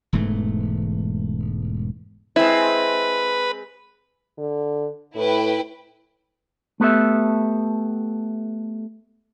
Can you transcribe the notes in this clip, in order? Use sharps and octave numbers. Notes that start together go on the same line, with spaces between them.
E1 G#2 E3 A3
G#3 C4 E4 B4
D3
A2 E4 B4 G5
A3 B3 G4 A4 E5